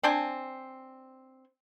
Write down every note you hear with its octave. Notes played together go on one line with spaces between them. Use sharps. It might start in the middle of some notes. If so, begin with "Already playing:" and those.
C4 D4 C5 G#5